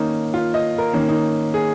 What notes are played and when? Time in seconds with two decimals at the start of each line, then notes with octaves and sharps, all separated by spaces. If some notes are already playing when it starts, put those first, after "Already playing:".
Already playing: D#3 A#3 C#4 D#4
0.34 F4
0.54 D#5
0.78 A#4
0.93 D#3 A#3 C#4
1.09 D#4
1.54 G#4